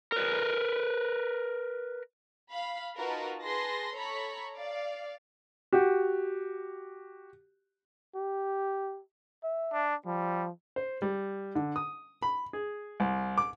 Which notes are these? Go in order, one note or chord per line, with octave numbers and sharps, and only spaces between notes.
A#4 B4
F5 B5
D#4 F4 F#4 A#4 B4 A5
G#4 B4 A5 C6 A#6
A4 C#5 A#5 B5 C#6
D5 F5
F#4 G4
G4
E5
D4
F3 G3
C5
G3
D3
D#6
B5
G#4
C2
D6